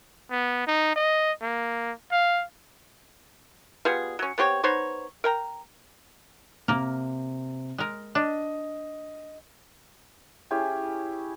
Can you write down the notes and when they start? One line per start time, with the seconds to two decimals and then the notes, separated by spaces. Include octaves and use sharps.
0.31 B3
0.67 D#4
0.96 D#5
1.42 A#3
2.12 F5
3.85 G3 B3 F4 G#4
4.19 F#3 C#4
4.38 B3 C4 G4 C#5
4.63 B3 D#4 C5 C#5
5.24 A#4 G5 A#5
6.68 C3 A#3 A#4
7.78 G#3 A#4
8.15 D4 D#5
10.51 C#4 E4 G4 G#4